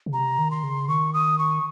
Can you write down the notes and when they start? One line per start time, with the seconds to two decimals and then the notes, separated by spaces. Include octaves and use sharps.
0.06 C#3
0.13 C3 A#5
0.38 D#3
0.51 C6
0.63 C#3
0.88 D#3 C#6
1.14 D#6
1.39 C#6